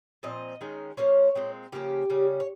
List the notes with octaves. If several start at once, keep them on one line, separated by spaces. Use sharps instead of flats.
A#2 F3 C4 D#5
D#3 G#3 C#4
F3 A#3 C#4 C#5
A#2 G#3 C4
C#3 F3 A#3 C#4 G4
C#3 G3 C#4
C#5